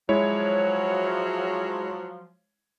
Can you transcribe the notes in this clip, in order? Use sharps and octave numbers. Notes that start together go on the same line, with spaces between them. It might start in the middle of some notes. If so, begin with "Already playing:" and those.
F3 F#3 G#3 E4 C#5